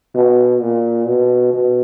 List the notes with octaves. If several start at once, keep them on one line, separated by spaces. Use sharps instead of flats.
B2
A#2
B2
B2